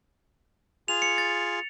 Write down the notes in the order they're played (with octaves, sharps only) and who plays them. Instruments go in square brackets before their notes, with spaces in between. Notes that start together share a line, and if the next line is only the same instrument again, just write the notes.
[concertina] F4 G#4 [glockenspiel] F7
[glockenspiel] C#7
A6